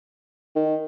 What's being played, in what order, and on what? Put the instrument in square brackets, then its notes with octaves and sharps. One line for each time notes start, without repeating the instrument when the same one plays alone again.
[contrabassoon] D#3